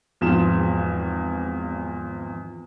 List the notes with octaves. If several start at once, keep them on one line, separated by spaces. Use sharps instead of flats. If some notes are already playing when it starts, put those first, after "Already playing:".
G#1 E2 F3 F4 E7